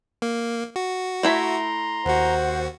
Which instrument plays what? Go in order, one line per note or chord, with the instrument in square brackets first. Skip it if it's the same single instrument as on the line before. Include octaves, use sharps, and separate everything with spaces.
[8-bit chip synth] A#3
F#4
[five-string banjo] A3 E4 E5 [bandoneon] A#5 C6
[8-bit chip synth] D#2 F#4 [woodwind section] C5 F#5